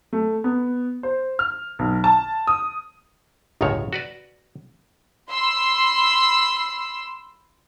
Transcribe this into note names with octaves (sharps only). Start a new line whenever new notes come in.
A3
B3
C5
F6
B1
A5
D#6
G1 C#2 F#2 A2 D#3 C#5
F#4 B4 D5
B5 C6 E6